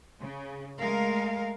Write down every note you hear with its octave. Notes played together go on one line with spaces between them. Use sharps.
C#3
G#3 A3 A#4 F5